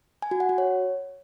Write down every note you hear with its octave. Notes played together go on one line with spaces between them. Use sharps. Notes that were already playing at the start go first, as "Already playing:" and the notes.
G#5
F#4
F#5
F#4
C#5